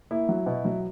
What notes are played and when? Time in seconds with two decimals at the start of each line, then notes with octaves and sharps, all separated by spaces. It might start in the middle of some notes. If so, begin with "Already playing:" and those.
0.11 A#3 E4
0.29 F#3
0.46 B2
0.65 F#3